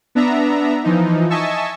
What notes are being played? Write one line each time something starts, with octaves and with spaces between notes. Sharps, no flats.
B3 D4 E5 A#5
E3 F3 D#4
D#5 E5 G#5 A5 C#6 E6